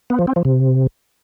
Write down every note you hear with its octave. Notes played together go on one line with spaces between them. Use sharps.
B3
F3
C4
F3
C3